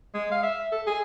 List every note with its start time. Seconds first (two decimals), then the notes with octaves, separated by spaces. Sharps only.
0.14 G#3
0.32 F5
0.43 E5
0.72 A4
0.87 G#4